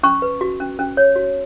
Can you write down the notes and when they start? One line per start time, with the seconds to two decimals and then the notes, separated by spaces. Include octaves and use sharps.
0.03 C#4 C#6
0.22 B4
0.41 F#4
0.60 C#4
0.79 C#4
0.97 C#5
1.16 F#4